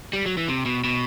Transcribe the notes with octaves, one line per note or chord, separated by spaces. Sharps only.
G3
F#3
E3
C3
B2
B2